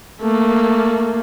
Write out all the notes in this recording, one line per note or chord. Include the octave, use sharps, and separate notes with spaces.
A3 A#3